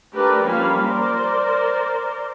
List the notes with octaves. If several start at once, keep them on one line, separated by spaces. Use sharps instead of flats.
A3 D4 G4 A#4 B4 D5
F3 G3 A#3 C#4 F5 B5
A#4 C5 D5